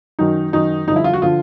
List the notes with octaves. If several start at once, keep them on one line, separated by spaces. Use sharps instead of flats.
F#2 D#3 F#3 D#4
F#2 D#3 F#3 D#4
G2 D3 F3 D#4
E4
F4
F#4
D3 F3 F4